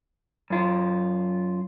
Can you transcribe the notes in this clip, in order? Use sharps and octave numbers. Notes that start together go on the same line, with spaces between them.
F#2 F4